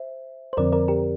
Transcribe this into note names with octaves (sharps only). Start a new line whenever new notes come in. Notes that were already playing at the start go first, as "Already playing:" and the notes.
Already playing: C5 E5
C5
F2 D3 F3 C4 A#4 D5
A#4 D5
G4 A#4